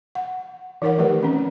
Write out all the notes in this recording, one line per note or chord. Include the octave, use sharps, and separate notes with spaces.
F#5
E3 D#4 A#4 C#5 F#5
D#3 F3 A3 G4 B4
C4 C#4